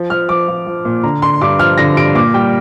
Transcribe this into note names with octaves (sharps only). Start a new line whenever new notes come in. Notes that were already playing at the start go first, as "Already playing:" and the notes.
Already playing: F3
F3 F6
F3 D6
F3
F3
A#2
D3 A#5
D3 C6
G2 D6
F3 F6
D3 A#6
G2 D7
A#2 D6
G3 G5